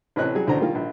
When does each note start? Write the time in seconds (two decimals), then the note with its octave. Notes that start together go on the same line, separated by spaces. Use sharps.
0.16 A1 C3 C4 C#5 D#5 F#6
0.35 F#3 G3 G#4
0.47 A1 D2 D4 F#4 C5 A#5
0.60 D#3 G3 A#3 F4 A#4
0.75 A#1